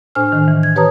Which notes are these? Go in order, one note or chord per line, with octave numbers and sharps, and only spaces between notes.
A2 D4 C5 G#5 F6
A2 D#3
E3
G#6
G4 B4 C#5 A5 A#5 D#6